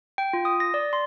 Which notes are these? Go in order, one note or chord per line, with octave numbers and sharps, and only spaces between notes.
G5
F4
D#6
A#6
D5
C6